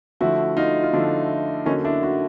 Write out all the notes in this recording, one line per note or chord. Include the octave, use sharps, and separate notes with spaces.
D3 F3 A3 E4 F#4
D#4 F4
F4
D3 F3 A3 D4 E4
D3 F#3 A#3 C#4 D#4
D4 E4
E4 F#4